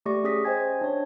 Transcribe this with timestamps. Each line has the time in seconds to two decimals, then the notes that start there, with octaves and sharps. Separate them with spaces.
0.06 A3 G4 D5 C#6 A#6
0.24 C#4 G#4 D#6 A#6 B6
0.45 C5 D#5 G5 G#5 G#6
0.81 D4 C#5